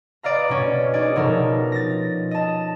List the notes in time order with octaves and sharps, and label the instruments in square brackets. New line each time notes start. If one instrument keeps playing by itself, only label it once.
[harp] B4 D5 D#5 F5 A#5
B2 C#4
C#4 D#4 G#4 D5
B2 F3 D#4 A4 A#4
A6 A#6
D#5 A5